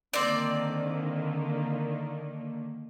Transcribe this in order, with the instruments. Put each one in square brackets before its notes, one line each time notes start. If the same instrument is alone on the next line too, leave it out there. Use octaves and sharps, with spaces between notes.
[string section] D3 D#3 A#3 [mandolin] C4 D5